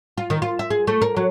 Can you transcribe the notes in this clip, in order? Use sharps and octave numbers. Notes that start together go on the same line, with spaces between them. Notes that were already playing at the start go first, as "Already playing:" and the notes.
F4
D#3
F4
E5
G#4
A3
A#4
F#3